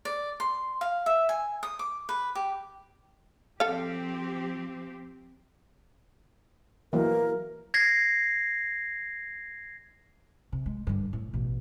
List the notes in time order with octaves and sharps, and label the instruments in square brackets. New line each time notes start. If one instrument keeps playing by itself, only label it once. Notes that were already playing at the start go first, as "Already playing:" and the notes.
[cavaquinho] D5
C6
F5
E5
G#5
D#6
D6
B4
G4
[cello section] F3 C4 G4 [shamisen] A4 F5
[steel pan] E3 F#3 A#3 [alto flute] A#4
[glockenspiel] G#6 A#6 C7
[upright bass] C3
G#3
G2 D3
A2
A1 B2